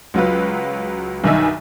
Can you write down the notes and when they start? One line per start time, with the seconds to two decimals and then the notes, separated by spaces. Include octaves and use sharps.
0.14 C#2 F#3 F4 B4
1.24 B1 G2 D#3 D#4 E5 G#5